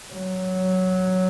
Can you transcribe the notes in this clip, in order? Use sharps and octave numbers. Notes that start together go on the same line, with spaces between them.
F#3